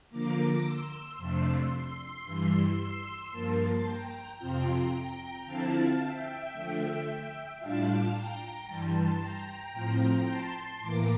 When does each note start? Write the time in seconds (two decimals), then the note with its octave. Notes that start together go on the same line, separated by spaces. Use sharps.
0.10 D3 F3 A#3 A#5 D6
0.64 C6 E6
1.17 F2 C3 F3 A3 D4
2.24 G2 E3 G3
2.78 C6 E6
3.32 G2 F3 A#3 A5 C6
3.85 G5 A#5
4.39 F2 C3 F3 C4 F4 G5 A#5
4.92 G5 A#5
5.46 D3 F3 C4 E4 F5 A5
5.99 E5 G5
6.52 D3 F3 A3 E5 G5
7.06 E5 G5
7.60 A2 G3 D4 F4 F5 A5
8.13 G5 A#5
8.67 G2 E3 G3 A5 C6
9.20 G5 A#5
9.74 A2 F3 C4 F4
10.27 A5 C6
10.81 A2 E3 A#3 A#5 D6